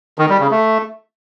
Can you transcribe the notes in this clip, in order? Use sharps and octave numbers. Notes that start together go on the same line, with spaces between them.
D#3
G3
C#3
A3